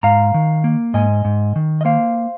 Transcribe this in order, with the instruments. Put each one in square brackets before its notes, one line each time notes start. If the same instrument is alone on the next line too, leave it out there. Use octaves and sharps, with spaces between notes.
[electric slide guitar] G#2 F5 A#5
D#3
A#3
G#2 D#5 G#5
G#2
D#3
D#5
A#3 C5 F5